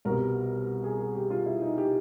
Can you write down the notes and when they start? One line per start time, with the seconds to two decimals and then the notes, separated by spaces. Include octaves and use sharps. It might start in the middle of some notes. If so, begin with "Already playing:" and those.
0.05 C2 B2 G3 A#4
0.84 G#4
0.99 G#4
1.15 G4
1.30 F4
1.46 E4
1.62 D#4
1.78 G4